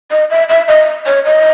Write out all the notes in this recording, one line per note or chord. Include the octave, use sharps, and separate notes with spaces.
D#5
E5
E5
D#5
C#5
D#5